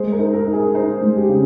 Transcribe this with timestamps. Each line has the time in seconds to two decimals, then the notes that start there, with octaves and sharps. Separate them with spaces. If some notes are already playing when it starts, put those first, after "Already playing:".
Already playing: G#3 C5
0.12 A#4
0.19 D#4
0.33 A#4
0.47 D#4
0.53 G#4
0.74 D#4 C5
1.01 G#3
1.16 G4
1.29 C#3